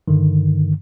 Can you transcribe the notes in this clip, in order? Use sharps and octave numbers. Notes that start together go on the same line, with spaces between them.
G2 D3 D#3